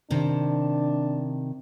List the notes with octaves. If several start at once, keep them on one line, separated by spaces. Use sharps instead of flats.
C3 D#3 D4